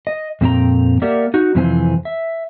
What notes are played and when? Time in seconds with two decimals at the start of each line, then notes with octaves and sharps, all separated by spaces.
0.07 D#5
0.41 F2 A#2 C4 E4 G5 A#5
1.02 A#3 G4 A#4 D5 E5 F#5
1.34 D#4 F#4
1.55 F2 C3 E3 F3 C4 G#5
2.05 E5